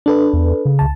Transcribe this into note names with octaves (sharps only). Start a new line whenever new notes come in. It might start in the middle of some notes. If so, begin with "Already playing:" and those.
D4 A4 B4
E2
C#3
C#2 A5